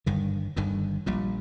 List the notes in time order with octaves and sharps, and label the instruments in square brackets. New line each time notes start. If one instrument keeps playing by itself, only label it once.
[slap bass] G1 G2 D3 D#3
G1 G2 D3 D#3
A#1 A#2 G3